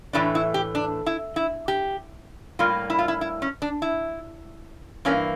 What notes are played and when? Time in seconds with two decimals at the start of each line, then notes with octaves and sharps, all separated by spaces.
0.13 A2 E3 A3 D4
0.35 E4
0.54 G4
0.75 D4
1.06 E4
1.36 E4
1.68 G4
2.59 A2 G3 A#3 F4
2.90 E4
2.99 F4
3.08 E4
3.21 E4
3.42 C#4
3.62 D4
3.82 E4
5.05 G2 E3 A#3 C#4